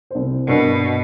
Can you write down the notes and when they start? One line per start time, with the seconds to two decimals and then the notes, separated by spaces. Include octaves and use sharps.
0.11 C2 C5
0.47 G2 B2 A#4